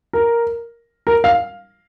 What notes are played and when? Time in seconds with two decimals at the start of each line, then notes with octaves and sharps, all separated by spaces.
0.13 A#4
1.07 A#4
1.24 F5